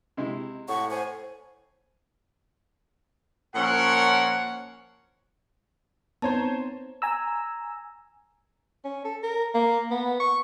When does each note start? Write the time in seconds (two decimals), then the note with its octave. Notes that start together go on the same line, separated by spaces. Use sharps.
0.17 C3 G#3 E4
0.69 A2 F#5 C#6
0.91 C5 G#5
3.55 A#2 F3 C#4 A#4 C#5 F#5
6.22 B3 C4 D#4 C5 C#5 A5 A#5
7.02 G#5 A#5 E6
8.85 C#4
9.04 A4
9.23 A#4
9.54 A#3
9.91 B3
10.20 C#6